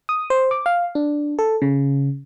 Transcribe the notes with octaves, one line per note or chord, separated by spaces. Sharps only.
D#6
C5
D6
F5
D4
A4
C#3